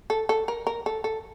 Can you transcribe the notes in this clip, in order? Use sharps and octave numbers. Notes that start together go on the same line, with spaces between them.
A4
A4
A#4
A#4
A4
A4